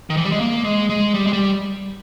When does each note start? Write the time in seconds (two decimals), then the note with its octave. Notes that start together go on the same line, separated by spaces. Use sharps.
0.10 D#3
0.17 E3
0.25 G3
0.32 G#3
0.40 A#3
0.64 G#3
0.90 G#3
1.14 G3
1.27 G#3
1.33 G3